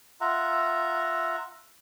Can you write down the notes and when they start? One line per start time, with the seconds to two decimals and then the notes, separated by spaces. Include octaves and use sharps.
0.21 F4 E5 F#5 A#5